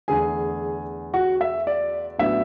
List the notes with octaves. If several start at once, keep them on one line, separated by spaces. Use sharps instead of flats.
E2 D3 A3 D4 G#4 G#5
F#4 F#5
E5
D5
A1 F#3 B3 D4 E5